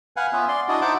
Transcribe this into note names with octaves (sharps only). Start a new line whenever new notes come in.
B4 F5 F#5 G#5
B3 C#4 F4 E5
D5 C6
D4 E4 F#4 D5 D#5
D#4 C5 E5 F#5 A5 D6